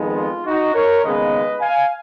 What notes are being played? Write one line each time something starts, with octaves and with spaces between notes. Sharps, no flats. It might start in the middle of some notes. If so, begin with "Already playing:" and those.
Already playing: F2 D#3 G#3 B3
F4
D#4 F#4
A#4 C#5
D#2 C#3 G#3 B3 B4 D#5
F5 G#5